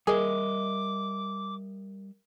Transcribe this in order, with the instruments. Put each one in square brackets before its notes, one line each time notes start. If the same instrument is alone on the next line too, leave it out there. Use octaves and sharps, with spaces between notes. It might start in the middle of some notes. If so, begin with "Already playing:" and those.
[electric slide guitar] G3 D#5 E5 [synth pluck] G#4 [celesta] A#4 [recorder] D6